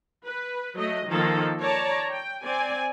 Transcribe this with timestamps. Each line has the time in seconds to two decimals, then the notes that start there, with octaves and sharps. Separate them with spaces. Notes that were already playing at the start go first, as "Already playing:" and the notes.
0.25 B4
0.75 F#3 A3 D#5
1.07 D#3 F3 A#3 A4
1.60 C#5 D5 A5 A#5
2.10 G5
2.43 C4 D5 G#5